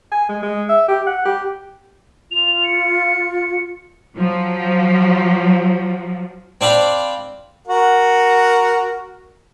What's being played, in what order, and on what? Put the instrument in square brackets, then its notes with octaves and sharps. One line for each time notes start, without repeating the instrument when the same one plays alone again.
[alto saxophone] G#5
G#3
G#3
E5
G4
F#5
G4
[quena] F4 [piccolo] F7
[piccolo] C#7
[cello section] F3 F#3
[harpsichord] C4 D4 F5 B5
[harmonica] F#4 A#4 F#5